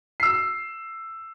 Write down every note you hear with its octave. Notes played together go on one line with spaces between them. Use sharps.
E6 C7